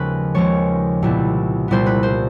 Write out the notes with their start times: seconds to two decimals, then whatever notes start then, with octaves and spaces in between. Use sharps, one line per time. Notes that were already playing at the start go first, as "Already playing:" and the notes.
Already playing: D#2 C#3 F3 G#3 C#4 B4
0.34 D#2 C#3 F3 G#3 C#4 C#5
1.02 C2 A#2 G3 B3 E4
1.68 C2 A#2 G3 B3 E4 C5
1.86 B4
2.03 C5